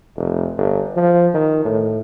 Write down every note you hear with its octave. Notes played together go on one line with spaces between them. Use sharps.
F1
G1
F3
D#3
A2